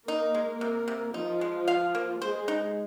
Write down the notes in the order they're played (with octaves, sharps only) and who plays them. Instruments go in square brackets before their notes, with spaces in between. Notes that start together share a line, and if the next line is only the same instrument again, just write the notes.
[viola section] A#3 A#4 [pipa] D#4
[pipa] G#3
C3
C3
[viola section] F3 F4 [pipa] D#4
[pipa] G#3
F5
A#3
[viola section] G#3 G#4 [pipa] C5
[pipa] D#4